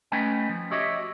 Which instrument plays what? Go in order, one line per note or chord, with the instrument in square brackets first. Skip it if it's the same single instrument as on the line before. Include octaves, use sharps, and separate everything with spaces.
[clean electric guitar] A3 C#4 D#4 B4 G5 G#5
F3
F#4 G4 C#5 D#5 E5